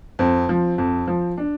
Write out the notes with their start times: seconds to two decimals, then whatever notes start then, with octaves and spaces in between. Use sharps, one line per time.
0.19 F2 C4
0.49 F3
0.78 F2
1.07 F3
1.38 D4